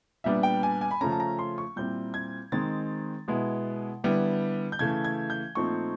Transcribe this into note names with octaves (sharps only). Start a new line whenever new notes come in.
A#2 G3 B3 D4 E5
G5
G#5
G#5
B5
C#3 F3 A3 C#4 A#5
A5
A#5
C6
C#6
A#2 G3 C4 E4 G6
G#6
D#3 G#3 C4 D#4 A6
B2 G#3 B3 E4
D3 G3 B3 E4
G6
C#3 E3 A3 G#6
G#6
G6
A#2 F3 A3 C4 D#4 C#6